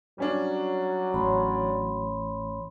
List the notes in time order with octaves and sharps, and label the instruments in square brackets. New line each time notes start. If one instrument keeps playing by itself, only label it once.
[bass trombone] F#3 [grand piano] G3 C#4 D4
[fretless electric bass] A1 [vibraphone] C#5 B5 C6